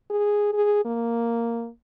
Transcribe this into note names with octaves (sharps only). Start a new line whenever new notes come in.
G#4
G#4
A#3